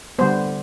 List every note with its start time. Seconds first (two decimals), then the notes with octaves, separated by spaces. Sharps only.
0.19 D3 G3 B3 C5